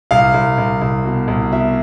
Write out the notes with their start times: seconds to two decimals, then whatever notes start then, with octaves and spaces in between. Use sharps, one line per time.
0.11 C2 F5
0.34 C2
0.58 C2
0.81 C2
1.05 B2
1.28 C2
1.52 B2 E5